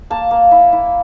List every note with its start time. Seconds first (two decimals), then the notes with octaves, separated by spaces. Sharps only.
0.10 A#3 A5
0.31 A#3
0.51 E4
0.73 E4